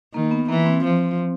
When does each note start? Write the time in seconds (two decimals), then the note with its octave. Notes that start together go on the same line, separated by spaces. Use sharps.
0.14 D#3 A#3
0.31 B3
0.49 E3 A#3
0.66 C4
0.84 F3 C4